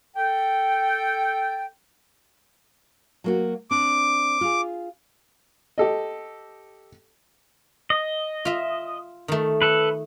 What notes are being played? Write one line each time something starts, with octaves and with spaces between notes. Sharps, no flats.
A4 G5
F#3 A#3 F#4
C4 D4 D6
F4 G#4
G4 A4 D#5
D#5
F4 E5
D#3 A3
A4 B4